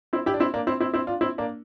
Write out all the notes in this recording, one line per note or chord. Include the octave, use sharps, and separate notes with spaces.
C4 E4
E4 G4
D4
C4 E4
A#3 D4
C4 E4
C4 E4
C4 E4
D4 F4
C4 E4
A#3 D4